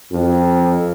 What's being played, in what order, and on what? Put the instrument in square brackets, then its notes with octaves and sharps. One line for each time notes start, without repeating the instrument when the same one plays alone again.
[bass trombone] F2